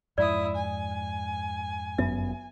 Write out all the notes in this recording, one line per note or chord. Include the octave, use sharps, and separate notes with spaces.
F2 G#2 E4 D5 D#6
G#5
G1 F#2 B3 E5